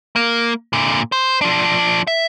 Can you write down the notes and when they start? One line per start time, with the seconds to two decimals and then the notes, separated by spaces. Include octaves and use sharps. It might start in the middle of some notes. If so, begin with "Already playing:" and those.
0.16 A#3
0.73 A#2 D3
1.12 C5
1.41 F3 D4
2.07 E5